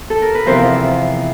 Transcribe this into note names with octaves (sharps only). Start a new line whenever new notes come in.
A4
A#4
B4
E2 C3 F3 A#4 C5